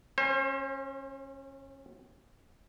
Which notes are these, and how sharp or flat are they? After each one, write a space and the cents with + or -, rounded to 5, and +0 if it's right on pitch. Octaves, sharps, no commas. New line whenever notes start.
C#4 -25 C5 +35